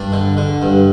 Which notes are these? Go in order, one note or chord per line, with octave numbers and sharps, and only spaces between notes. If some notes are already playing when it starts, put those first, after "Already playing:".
Already playing: G2 D4
D3
D3
G2